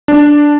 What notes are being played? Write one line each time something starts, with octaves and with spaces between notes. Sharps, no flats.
D4